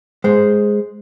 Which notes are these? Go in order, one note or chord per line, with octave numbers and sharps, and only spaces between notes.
G#3 C5